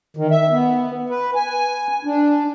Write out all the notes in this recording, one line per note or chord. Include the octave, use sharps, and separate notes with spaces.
D#3
E5
B3
B4
G#5
D4